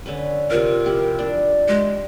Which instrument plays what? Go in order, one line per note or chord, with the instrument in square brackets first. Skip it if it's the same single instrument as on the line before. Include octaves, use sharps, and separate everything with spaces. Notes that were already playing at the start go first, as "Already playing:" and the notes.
[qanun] D3 C#4 B4
[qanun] C3 F4 [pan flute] A#4
[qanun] F3 E4 G4
D4 D5
[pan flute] G#3 [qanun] G4